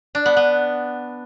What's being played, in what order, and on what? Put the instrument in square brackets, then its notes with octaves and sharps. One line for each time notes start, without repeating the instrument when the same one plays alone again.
[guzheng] D4
B3
B3